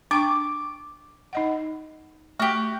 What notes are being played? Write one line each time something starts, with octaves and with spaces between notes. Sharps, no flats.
D4 G5 C#6 D6
D#4 D#5 F#5
A3 F#4 G4